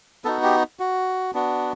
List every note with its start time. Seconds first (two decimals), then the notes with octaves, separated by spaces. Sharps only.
0.25 B3 D#4 F#4 A4
0.43 G4
0.80 F#4
1.34 B3 D4 F#4